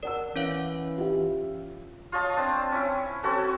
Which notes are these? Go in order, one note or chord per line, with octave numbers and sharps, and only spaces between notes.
A#4 D5 F#5 E6
E3 C#4 C#5 F5
F4 G4 E5
F4 C#5 D#5 A5
C4 D4
C#4 E4
C4 C#4 F#4 A4